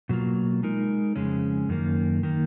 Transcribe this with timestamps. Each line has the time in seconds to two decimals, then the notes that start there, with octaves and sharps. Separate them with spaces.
0.09 B2 F#3 A#3 F4
0.63 G#3 D#4 A#4
1.16 F2 C#3 G#3 C#4
1.69 F#2 D#3 A#3
2.23 D#3 A#3